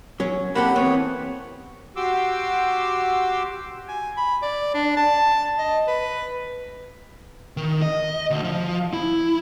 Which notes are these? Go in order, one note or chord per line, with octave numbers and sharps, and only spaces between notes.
F#3 C#4
A#3 C4 G4 A4 F#5 B5
E3 B3 C4 C#5
F#4 G4 C6 D6 E6
G#5
B5
D5
D4
A5
D#5
B4
D#3
D#5
D2
F3
E4